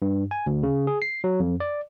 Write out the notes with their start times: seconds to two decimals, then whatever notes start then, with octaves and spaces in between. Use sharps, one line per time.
0.02 G2
0.31 G#5
0.46 D2
0.63 C#3
0.87 G#4
1.02 C7
1.24 F#3
1.40 F2
1.60 D5